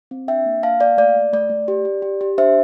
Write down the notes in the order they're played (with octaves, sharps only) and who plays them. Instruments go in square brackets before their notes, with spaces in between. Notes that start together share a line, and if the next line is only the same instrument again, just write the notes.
[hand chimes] C4
D4 E5 G5
A#3
A#3 F5 A5
A#3 D5 F5
A3 D5
A3
A3 D5
A3
G4
G4
G4
G4
D4 C5 E5